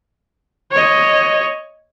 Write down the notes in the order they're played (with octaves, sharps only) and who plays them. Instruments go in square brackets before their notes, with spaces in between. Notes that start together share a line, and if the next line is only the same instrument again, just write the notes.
[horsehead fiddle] C#5 D#5